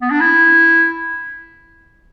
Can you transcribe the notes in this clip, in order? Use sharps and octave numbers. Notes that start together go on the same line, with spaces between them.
B3
D4
E4